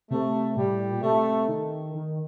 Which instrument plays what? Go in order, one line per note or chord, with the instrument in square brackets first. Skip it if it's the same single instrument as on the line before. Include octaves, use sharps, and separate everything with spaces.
[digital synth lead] C3 [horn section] A3
[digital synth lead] A2 [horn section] G3
[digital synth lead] A#2
[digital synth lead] C3 [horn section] A3
[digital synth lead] D#3
D#3